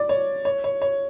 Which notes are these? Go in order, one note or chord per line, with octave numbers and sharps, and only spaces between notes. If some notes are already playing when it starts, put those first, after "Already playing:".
Already playing: D5
C#5
C#5
C#5
C#5